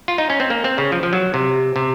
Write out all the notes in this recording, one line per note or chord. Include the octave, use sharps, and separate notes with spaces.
F4
D#4
C#4
C4
A#3
C4
C#3
F3
F3
F#3
C3
C3